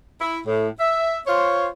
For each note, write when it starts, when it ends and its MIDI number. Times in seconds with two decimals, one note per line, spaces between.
0.21 0.40 64
0.46 0.68 45
0.80 1.19 76
1.27 1.68 65
1.27 1.68 72
1.27 1.68 73